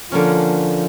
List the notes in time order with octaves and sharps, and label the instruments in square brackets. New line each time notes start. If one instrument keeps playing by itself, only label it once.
[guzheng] D3 A#3 C#4 [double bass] F3